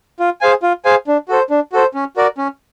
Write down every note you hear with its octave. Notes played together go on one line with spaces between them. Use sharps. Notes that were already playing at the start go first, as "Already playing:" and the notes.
F4
G#4 C5 F5 G#5
F4
G#4 C5 F5 G#5
D4
F#4 A4 C5
D4
F#4 A4 C5
C#4
F#4 A#4 D5
C#4